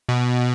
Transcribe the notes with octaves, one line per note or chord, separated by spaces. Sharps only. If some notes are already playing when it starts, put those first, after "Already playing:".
B2